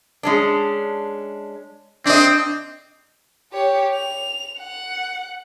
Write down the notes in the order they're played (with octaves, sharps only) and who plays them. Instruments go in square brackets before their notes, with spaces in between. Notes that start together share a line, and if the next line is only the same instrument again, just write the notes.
[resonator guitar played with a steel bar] G#3 C#4 D4
[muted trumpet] C4 [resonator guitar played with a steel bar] D4 D#5
[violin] G4 C#5
F7
F#5